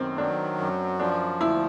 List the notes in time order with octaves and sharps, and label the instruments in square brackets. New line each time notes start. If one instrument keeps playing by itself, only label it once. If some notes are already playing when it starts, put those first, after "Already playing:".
Already playing: [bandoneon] F#2 D#3 [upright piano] C4
[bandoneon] F#3 [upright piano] D4
[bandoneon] F#2
[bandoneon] F3 [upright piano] D4
[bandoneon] D2 [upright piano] E4